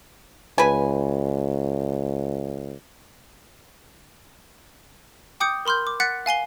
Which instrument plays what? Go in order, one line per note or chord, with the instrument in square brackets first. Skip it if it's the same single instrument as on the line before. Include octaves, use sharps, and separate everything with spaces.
[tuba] C#2 [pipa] B4 G#5
[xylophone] G5 D6 D#6 G6 C#7
A#4 B5 C6 F6 G6
D6
F#5 F#6 A6 B6 C#7
F5 G#5 C7 G7